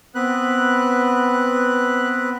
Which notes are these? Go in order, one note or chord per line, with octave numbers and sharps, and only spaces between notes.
B3 C4 B4 F#6